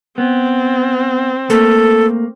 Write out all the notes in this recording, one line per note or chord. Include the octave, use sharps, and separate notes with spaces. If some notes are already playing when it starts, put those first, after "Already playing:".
B3 C4
A3 A#3 A4